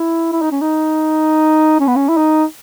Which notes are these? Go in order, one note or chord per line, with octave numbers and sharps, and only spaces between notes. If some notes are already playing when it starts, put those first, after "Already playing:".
Already playing: E4
E4
D#4
C#4
D#4
C#4
B3
C#4
E4
D#4